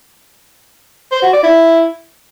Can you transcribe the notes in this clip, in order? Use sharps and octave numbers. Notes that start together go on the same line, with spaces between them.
C5
F#4
D5
E4